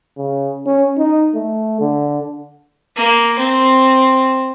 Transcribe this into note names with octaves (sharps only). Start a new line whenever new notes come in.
C#3
C#4
D#4
A3
D3
A#3
C4